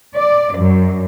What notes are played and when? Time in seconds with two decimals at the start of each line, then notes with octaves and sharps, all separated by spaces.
0.17 D5
0.56 F#2